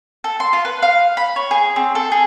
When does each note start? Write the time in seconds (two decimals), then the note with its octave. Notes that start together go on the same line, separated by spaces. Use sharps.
0.24 A4
0.40 C6
0.53 F4
0.65 B4
0.82 F5
1.17 B5
1.36 C#5
1.51 G#4
1.76 C4
1.95 A4
2.12 G#4